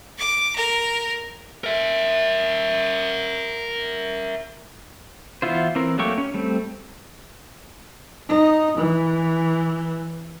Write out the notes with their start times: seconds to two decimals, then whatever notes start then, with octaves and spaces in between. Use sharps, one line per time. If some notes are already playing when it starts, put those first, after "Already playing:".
0.19 D6
0.57 A#4 A#5
1.64 A#4 E5
5.42 E3 B3 E4 F4 C5
5.75 E3 C4 A#4
5.98 F#3 A3 A#3 G4 C#6
6.18 C#4
6.34 G3 A3 C4
8.29 D#4
8.78 E3